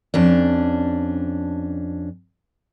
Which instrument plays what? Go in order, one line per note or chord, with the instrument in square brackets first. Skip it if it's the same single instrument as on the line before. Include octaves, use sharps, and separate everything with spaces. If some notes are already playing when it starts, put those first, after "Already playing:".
[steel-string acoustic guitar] F2 C#4 D4